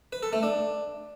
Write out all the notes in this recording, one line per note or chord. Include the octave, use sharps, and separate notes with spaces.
B4
A4
A3
D4